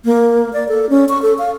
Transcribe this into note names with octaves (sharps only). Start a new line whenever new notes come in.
A#3
D5
A4
C#4
C#6
A4
F5